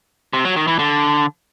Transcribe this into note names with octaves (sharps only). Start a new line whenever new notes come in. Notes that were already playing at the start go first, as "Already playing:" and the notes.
C3
F#3
D#3
E3
D3